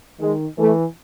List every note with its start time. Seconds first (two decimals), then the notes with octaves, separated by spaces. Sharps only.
0.19 D#3 G#3
0.58 E3 A3